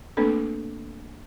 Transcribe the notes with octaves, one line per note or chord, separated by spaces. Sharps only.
A3 A#3 C4 D4 A4 B4